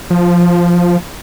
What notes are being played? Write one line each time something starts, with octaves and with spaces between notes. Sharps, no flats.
F3